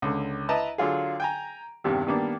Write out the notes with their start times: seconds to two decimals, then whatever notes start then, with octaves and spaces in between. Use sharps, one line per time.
0.02 C#2 D3
0.49 E4 B4 D#5 A5 A#5
0.78 D3 F#3 F4 G#4
1.20 G5 G#5 A#5
1.84 E2 G2 C3 D#3
2.07 D#3 G3 A#3 B3 D4